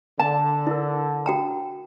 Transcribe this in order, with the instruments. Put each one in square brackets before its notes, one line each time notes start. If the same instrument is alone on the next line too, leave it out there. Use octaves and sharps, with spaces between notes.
[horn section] D3 [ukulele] A5
[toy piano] E4 A#4
F#4 G5 A#5